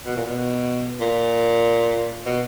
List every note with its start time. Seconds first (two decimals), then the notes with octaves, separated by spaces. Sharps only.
0.06 B2
0.17 A#2
0.26 B2
1.00 A#2
2.26 B2